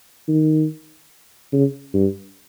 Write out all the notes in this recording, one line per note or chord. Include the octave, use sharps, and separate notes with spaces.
D#3
C#3
G2